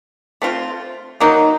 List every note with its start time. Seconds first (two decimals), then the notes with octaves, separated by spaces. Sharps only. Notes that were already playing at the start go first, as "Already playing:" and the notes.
0.42 A3 C4 F4
1.20 F#3 A#3 D#4